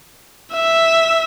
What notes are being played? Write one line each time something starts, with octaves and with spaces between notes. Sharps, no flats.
E5